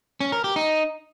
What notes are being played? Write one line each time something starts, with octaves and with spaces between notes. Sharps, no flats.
C#4
A#4
G4
D#4